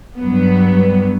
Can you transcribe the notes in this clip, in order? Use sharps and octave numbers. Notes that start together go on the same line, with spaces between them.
G2 F#3 B3